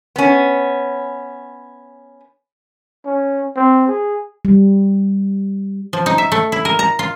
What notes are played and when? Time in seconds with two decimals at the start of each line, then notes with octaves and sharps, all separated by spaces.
0.16 B3 C#4
3.05 C#4
3.56 C4
3.87 G#4
4.45 G3
5.93 F3
6.06 D#4
6.18 E5
6.32 A3
6.52 E4
6.65 A#4
6.79 A#5
6.99 F4